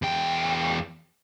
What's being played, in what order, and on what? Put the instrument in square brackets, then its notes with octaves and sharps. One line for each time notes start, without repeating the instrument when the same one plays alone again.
[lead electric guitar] E2 G5